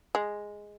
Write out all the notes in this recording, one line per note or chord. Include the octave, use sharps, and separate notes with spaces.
G#3